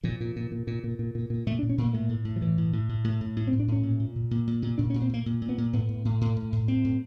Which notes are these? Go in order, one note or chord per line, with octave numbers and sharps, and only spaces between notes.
A#2 F3
A#2
A#2
A#2
A#2
A#2
A#2
A#2
A#2
A#2 A3
D4
A#2
C#4
A#2 A#3
A2 A3
A2
A2
F3
A2 E3
A2
A2
A2
A2
A2
A2
C4
A2
D4
A2 C#4
A#2
A#2
A#2
A#2
A#2
A#2
A#2 D4
C#4
A#2
C4
A#2 A#3
A#2
A#2
B3
A#2
A2 B3
A2
A2
A2
A2
A2
A2 C4
A2